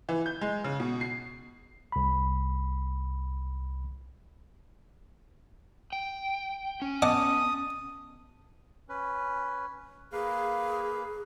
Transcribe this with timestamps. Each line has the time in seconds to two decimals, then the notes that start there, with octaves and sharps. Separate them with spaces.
0.09 E3
0.26 G6
0.41 G#3
0.64 C#3
0.80 B2
1.01 C7
1.92 C2 B5
5.93 G5
6.82 C#4
7.02 B3 D#5 F#5 A5 D6 D#6
8.89 C#4 B4
10.12 A#3 G#4 B4 F5